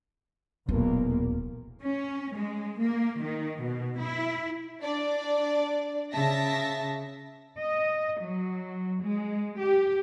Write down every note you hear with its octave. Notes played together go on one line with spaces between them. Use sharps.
D#1 B1 E2 A#3
C#4
G#3
A#3
D#3
B2
E4
D4 D5
C#3 E5 A5 A#6
D#5
F#3
G#3
G4